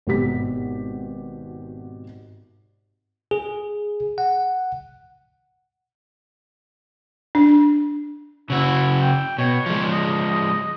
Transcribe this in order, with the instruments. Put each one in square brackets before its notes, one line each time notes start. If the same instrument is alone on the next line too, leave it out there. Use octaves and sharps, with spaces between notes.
[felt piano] G#1 B2 G4 B6
[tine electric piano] G#4
F#5
[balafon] D4
[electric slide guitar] C#3 F#4 [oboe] E4
[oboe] G5
[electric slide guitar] B2 [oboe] C#5
[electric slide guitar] F3 G#3
[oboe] D#5